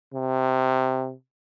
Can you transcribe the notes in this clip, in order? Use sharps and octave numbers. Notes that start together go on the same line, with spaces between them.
C3